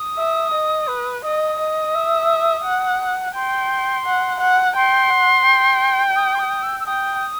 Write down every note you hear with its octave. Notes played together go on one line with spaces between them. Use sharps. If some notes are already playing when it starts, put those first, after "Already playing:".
Already playing: D#6
E5
D#5
B4
D#5 D#6
D#5
E5
F#5
G5 C6
F#5
F#5
G5 C6
F#5
G5
D#6
C6
D#6
E6
E6
G5 D#6